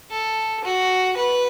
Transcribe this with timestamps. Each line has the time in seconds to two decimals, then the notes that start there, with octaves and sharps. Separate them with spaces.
0.11 A4
0.64 F#4
1.17 B4